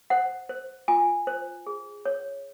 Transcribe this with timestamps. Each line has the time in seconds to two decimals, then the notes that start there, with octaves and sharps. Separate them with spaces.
0.10 C5 F#5
0.49 C5
0.88 F4 G#5
1.27 C5
1.67 G#4
2.05 C#5